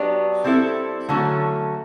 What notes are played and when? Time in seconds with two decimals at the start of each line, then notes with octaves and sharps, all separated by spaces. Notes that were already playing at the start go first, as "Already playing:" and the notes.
Already playing: F#3 B3 D4 G4
0.44 G3 C4 E4 A4
1.09 D3 F#3 A3 C#4